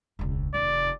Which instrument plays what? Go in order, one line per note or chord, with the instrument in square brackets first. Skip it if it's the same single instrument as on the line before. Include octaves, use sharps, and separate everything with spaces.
[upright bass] E1 C#2
[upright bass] F1 D#2 [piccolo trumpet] D5